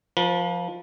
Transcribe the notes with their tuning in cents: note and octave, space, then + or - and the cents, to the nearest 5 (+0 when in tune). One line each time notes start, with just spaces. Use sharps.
F3 +10 B4 -45